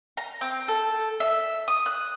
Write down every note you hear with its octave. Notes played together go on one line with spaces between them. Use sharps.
A#5
C4
A4
E5
D#6
F#6